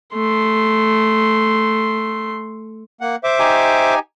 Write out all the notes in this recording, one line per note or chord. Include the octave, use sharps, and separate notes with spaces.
A3 C6
A#3 F#5
C5 E5 D6
D#4 G4 G#5